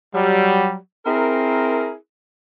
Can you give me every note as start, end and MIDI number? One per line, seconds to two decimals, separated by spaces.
0.14 0.76 54
0.14 0.76 55
1.05 1.94 60
1.05 1.94 64
1.05 1.94 68
1.05 1.94 70